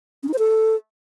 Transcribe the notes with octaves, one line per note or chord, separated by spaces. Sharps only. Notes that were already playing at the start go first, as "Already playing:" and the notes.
C#4
D#4
C5
A4